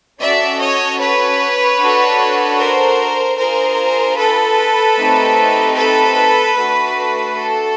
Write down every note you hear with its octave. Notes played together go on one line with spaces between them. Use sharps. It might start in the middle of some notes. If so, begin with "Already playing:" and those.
C#4 F#4 A4 D5 E5
C#5 D#5
B4 C#5
D4 F#4 A4
A#4 C5
D4 F4 G#4 A#4 C5
A4 B4
A3 C4 D#4 G4
A4 B4
A3 D4 F#4 A4
A4